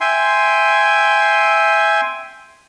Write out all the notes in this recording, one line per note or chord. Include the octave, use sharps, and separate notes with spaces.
E5 G5 G#5 C6